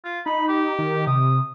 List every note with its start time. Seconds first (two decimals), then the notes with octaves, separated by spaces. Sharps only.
0.05 F4
0.26 D#4 B5
0.48 G4
0.79 D#3
1.07 C3 D#6